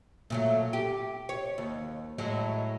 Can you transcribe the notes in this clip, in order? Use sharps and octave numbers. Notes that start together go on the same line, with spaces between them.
A#2 F#3 A3
G4
C#5
D#2
A2 F#3 G#3